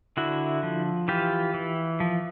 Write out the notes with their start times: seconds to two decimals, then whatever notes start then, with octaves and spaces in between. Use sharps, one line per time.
0.17 D3 E4 F#4
0.63 F3
1.08 E3 F4 G4
1.54 E3
2.00 F3